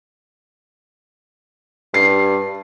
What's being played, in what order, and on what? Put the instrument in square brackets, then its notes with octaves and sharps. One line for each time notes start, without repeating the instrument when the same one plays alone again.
[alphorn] G2 [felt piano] C7